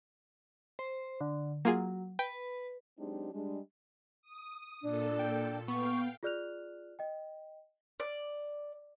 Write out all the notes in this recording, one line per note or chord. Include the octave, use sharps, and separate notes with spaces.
C5
D3
F#3 A#3 F4 G#4
B4 G5
F#3 G#3 C4 D4 D#4 G4
G3 G#3 D4
D#6
A#2 D4 A4
G5
B3 F5 G5 C#6
F4 G#4 D5 F6 F#6 F7
D#5 G5
D5